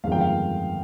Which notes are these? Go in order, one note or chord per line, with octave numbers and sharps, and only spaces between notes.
G1 F2 D#3 G#3 F5
G5
F5